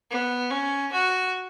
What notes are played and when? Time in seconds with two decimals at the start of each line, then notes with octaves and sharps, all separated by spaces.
0.11 B3
0.51 C#4
0.92 F#4